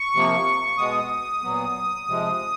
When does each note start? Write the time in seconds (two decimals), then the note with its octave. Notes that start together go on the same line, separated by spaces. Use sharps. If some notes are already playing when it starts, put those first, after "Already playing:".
Already playing: C#6
0.14 C3 F3 A#3
0.77 B2 G#3 B3 D#6
1.42 A#2 F#3 B3
2.07 C3 F3 G#3